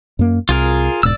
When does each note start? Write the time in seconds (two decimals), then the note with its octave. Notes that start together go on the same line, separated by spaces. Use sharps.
0.19 F#2 A#3
0.49 C2 F4 G#4 A#4
1.03 E1 G#2 D5 E6